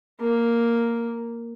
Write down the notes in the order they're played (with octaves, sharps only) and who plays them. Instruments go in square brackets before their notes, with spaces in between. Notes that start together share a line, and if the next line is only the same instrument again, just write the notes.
[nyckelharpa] A#3